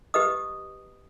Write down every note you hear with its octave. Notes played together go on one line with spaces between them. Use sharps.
G4 B4 D#5 D#6